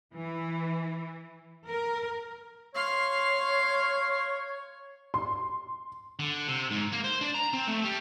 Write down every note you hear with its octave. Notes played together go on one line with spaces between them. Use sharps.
E3
A#4
C#5 F5 C6
C6
D3
C3
G#2
A#3
C5
D4
A#5
C4
A3
G3